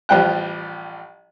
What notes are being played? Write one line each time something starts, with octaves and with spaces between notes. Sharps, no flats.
A1 F3 G3 G5 F#6